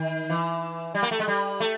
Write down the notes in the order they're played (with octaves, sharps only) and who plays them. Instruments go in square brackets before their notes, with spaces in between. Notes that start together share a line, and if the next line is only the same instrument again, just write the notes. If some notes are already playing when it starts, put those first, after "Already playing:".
Already playing: [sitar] D#3
E3
G3
A#3
A3
G#3
G3
A3